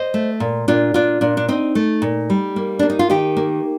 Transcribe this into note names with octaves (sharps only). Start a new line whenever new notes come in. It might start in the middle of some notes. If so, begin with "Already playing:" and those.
Already playing: C5 D#5
A3
A#2
A#2 D4 F4
A#2 D4 F4
A#2 D4
D4
C4 D#4
A3
A#2
G3
A#3
A#3 D4
D#4
F4
D#3 D#4 G4
A#3